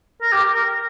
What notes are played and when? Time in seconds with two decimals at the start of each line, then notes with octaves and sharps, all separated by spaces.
0.22 A#4
0.33 G4
0.55 A#4